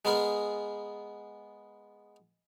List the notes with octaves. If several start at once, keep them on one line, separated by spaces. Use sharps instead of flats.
G#3 B3 G#4 A#4